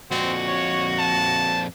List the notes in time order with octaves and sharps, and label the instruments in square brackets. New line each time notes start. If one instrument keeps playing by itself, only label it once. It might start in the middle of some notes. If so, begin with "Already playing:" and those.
[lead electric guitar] F2 A#2 [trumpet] C4 [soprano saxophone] F#4
[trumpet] C#5
A5